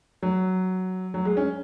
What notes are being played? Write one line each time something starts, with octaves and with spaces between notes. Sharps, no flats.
F#3
F#3
G#3
C#4